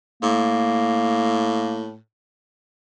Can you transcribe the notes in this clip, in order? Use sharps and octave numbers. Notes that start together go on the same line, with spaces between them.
A2 A#3